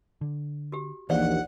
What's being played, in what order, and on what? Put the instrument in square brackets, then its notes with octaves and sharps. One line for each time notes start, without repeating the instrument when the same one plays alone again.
[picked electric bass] D3
[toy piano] F#4 G4
[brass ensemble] A#1 D#2 [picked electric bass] E3 [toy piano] C5 D5 F5 [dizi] F#5